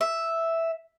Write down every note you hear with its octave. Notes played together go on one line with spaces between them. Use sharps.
E5